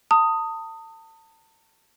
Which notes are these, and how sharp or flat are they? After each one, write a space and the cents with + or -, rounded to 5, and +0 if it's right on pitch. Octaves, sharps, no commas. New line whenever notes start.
A5 +35 D#6 +0